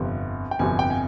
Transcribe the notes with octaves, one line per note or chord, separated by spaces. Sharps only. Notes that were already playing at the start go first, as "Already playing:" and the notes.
Already playing: G1 F2 C3
G5
G1 F2 C3 G#5
G5
G#5